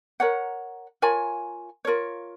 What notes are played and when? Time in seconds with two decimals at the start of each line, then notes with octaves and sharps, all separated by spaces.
0.20 A#4 C#5 F#5
1.02 F4 A#4 C#5 G#5
1.85 F4 A#4 C#5